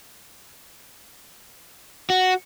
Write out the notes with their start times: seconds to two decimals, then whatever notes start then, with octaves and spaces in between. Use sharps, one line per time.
2.10 F#4